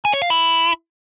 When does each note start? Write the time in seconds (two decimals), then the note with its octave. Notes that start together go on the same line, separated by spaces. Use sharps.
0.05 G#5
0.13 C#5
0.22 F5
0.30 E4